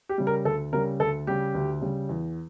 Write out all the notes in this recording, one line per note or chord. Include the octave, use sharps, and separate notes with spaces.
G4
C#3 G3
A#4
D2 A4
C#3 G3 A#4
D2 A4
C#3 G3 G4
D2
C#3 G3
E2